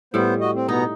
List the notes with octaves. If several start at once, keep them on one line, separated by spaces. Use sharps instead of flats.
A2 G3 B3 C5
F#4 D#5
C4
B2 B3 D#4 A#5